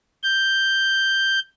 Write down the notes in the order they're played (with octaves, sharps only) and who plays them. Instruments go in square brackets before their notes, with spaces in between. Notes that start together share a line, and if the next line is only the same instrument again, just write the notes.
[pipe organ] G6